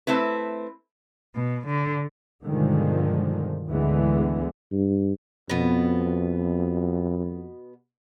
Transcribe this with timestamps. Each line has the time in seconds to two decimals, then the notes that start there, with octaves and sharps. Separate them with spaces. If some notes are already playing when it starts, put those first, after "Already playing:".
0.07 A3 C4 E4 B4
1.35 B2
1.68 D3
2.44 G2 B2 D3 D#3 F3 G#3
3.67 D2 G#2 D3 E3 G#3 B3
4.72 G2
5.50 F2 B2 B3